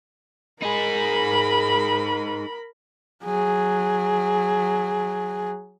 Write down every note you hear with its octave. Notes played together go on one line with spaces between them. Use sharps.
D#4 G#4 A#4 B5
F#3 G#4